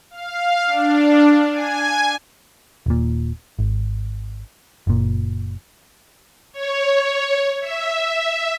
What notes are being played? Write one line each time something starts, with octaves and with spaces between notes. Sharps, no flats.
F5
D4
G#5
D#1 A#2
G#1
F#1 A#2
C#5
E5